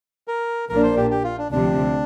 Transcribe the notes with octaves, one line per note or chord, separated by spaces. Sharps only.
A#4
A#1 A#2 A#3 D4 A#4
C5
G4
G4
F4
D4
D2 C3 F3 D4